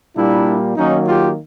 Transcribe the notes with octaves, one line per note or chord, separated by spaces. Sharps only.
A#2 G3 A#3 D4 E4
D#3 F#3 A#3 C#4 D#4
F4 G4